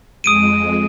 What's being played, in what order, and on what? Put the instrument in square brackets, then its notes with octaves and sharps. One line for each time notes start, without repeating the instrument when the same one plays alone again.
[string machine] F2 G#3 [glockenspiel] D#6 D7 D#7